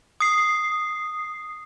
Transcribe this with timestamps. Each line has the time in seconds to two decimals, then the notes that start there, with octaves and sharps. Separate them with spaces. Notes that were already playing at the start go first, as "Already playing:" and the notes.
0.20 D#6 C7